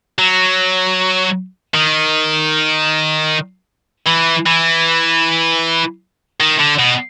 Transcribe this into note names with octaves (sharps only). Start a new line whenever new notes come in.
F#3
D#3
E3
E3
D#3
D3
B2